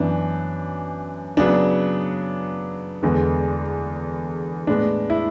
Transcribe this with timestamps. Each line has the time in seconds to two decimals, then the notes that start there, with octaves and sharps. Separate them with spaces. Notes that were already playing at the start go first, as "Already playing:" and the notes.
Already playing: F#2 E3 B3 D4
1.37 C#3 F#3 B3 D4
3.03 E2 D3 G#3 B3
4.67 A2 G#3 B3 D4
5.10 E4